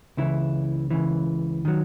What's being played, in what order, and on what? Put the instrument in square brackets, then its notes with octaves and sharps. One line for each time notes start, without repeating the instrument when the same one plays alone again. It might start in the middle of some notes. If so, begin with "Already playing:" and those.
[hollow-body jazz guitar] C#2 C#3 E3 E4
C#2 C#3 E3
D#3 F#3